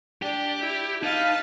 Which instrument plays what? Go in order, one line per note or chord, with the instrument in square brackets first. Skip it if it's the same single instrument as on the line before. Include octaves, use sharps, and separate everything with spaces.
[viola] D4 [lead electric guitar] G4
[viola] E4
[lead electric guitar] D#4 [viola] B4 A5 [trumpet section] F5